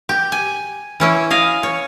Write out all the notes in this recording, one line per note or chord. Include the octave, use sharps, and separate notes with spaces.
G4
G#5
E3 C#4 E4
D#5 F5 G#5
C#5